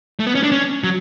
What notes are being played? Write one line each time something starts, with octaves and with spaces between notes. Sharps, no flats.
A3
B3
C#4
D4
C#4
F#3